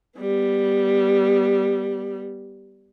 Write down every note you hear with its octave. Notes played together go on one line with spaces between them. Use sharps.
G3 B3